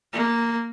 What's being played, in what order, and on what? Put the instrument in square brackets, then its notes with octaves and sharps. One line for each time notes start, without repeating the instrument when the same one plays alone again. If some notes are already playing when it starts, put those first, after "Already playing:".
[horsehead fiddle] A#3